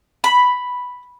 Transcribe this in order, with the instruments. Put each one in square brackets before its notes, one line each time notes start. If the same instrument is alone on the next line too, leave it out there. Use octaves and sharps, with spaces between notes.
[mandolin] B5